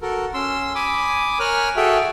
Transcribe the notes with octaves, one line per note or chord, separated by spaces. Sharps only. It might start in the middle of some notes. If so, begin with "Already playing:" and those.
F#4 A4 A#4
C#4 C6 E6
G#5 B5 D6 D#6
A#4 C#5 G#5 F6 F#6
F#4 G#4 A4 E5 G5